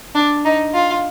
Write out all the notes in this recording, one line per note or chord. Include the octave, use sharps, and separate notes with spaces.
D4
D#4
F4